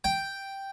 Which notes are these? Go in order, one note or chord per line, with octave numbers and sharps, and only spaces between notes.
G5